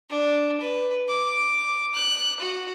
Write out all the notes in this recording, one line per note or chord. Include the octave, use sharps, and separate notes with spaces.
D4
B4
D6
F#6
F#4